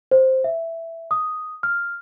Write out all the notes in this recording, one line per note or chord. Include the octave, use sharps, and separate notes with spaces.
C5
E5
D#6
F6